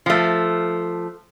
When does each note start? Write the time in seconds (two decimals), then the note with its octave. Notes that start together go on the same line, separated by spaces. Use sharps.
0.06 F3 A3